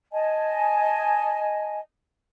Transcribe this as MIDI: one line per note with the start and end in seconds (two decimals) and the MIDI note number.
0.13 1.79 75
0.13 1.79 80
0.13 1.79 81